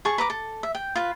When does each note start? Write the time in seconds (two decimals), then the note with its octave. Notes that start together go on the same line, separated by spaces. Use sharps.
0.05 G#4 A5 C#6
0.18 B4 A#5 D6
0.30 A4
0.63 E5
0.75 G5
0.95 F4 B4